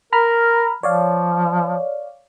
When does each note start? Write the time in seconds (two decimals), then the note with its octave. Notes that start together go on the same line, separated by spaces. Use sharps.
0.13 A#4 A#5 B5 F6
0.83 F3 C#5 D5 F5